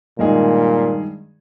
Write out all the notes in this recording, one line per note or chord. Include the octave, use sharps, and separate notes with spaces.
G2 A#2 D#3 G#3 D#4 G#4